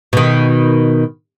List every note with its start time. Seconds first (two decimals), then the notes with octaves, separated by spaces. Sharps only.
0.13 B2 D#3